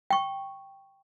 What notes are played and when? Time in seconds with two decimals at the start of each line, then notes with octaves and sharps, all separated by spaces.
0.10 G5 C#6